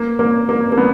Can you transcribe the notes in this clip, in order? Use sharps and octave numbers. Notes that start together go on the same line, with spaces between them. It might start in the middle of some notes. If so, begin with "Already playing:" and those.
Already playing: A#3
A#3
A#3
A#3
B3